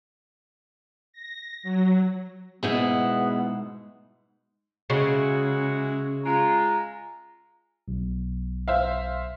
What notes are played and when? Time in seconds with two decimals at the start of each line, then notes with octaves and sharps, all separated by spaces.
1.13 A#6
1.63 F#3
2.63 G#2 B2 B3 E4 G#4
4.90 C#3 G#3 E4 F#4
6.26 G#3 F4 A#5
7.88 B1
8.68 C5 E5 F5